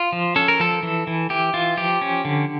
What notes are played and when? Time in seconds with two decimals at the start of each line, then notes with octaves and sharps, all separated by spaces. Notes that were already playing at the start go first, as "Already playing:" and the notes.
Already playing: F4
0.13 F3
0.36 C#4 A4
0.48 A#4
0.60 F3 A4
0.83 E3
1.07 E3
1.30 E3 G4
1.54 E3 F4
1.77 F3 G4
2.01 C#4
2.25 D3